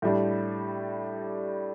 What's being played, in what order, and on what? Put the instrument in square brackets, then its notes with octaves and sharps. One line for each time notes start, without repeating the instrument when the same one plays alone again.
[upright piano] A2 G3 D4